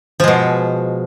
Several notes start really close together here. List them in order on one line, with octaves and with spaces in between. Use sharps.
F3 G#3 B2